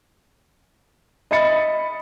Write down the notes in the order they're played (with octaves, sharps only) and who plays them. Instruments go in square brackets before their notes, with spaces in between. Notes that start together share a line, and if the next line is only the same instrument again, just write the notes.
[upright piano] D#5 E5 B5 A6 C#7